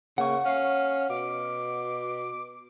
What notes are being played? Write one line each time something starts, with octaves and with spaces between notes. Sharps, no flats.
C#3 A#3 F#5 C#6
C#4 F5
B2 D6